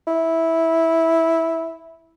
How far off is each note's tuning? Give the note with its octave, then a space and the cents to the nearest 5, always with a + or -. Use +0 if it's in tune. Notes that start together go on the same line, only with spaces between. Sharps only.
E4 -10